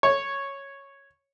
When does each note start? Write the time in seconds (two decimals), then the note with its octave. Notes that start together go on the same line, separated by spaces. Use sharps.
0.03 C#5